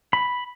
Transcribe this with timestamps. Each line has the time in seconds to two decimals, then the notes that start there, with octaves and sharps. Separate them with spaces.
0.13 B5